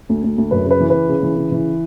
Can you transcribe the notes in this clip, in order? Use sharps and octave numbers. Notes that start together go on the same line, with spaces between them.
D2
D2
D2
F#2 B4
C#3 B4
E3
C#3 B4
C#3
E3
C#3
E3